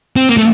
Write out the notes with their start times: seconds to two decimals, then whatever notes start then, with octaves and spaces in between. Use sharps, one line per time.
0.16 C4
0.29 A#3
0.38 A3